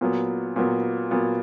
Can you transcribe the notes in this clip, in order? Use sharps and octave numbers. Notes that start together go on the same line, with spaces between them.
A#2 F#3 B3
A#2 F#3 B3
A#2 F#3 B3